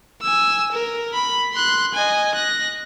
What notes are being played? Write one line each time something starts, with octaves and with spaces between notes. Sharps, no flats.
G#5 E6
A#4
B5
C6 F#6
D#5 G#5
F#6 A#6